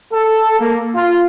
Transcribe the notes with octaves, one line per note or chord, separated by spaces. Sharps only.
A4
A#3
F4